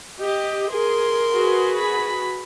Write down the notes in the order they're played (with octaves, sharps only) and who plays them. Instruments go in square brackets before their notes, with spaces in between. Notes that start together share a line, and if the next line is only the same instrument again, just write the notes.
[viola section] G4 [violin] D#5
[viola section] G#4 [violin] A#4 C6
[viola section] F#4 G#4 B4
[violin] B5